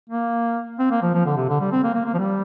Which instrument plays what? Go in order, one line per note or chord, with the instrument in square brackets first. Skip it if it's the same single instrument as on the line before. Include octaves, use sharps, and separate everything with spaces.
[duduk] A#3
C4
A#3
F3
F3
D3
C3
D3
G3
C4
A#3
A#3
A#3
F3
G3